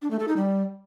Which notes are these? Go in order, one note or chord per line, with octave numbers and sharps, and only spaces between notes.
D4
A3
A4
D#4
G3